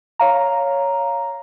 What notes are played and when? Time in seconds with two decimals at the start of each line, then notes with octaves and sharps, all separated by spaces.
0.19 C#5 F5 A#5